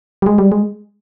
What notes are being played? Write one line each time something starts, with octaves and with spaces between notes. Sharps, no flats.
G3
G#3
G3
G#3